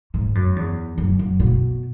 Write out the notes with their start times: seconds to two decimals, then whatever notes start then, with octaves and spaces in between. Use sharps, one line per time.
0.14 G#2
0.35 F#2
0.56 E2
0.98 F#2
1.19 F#2
1.40 B2